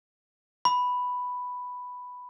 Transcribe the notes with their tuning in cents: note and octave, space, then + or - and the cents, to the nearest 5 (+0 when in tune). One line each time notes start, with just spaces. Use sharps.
B5 +5